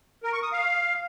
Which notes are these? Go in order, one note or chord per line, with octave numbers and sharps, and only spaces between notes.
A#4
C#6
D#6
F5